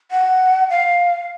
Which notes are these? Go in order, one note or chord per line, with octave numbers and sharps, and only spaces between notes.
F#5
F5